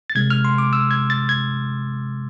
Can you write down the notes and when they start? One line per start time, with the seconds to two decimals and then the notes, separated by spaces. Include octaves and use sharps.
0.10 A6
0.15 C3 G#3 G#6
0.30 F6
0.45 C6
0.58 D6
0.73 E6
0.91 G#6
1.10 A6
1.29 G#6